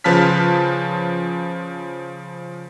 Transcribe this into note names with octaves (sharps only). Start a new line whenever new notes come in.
C#3 F3 B4 A5 F6 B6